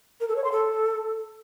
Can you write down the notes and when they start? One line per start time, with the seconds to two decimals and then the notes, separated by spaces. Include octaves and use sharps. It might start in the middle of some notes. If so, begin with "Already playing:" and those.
0.21 A#4
0.28 A4
0.36 C#5
0.44 C6
0.52 A4